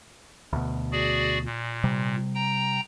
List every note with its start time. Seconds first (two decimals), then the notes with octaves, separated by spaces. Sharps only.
0.53 D2 B2
0.92 F#4 G#4 D5
1.45 A#2
1.84 C3 G3
2.35 G5 A#5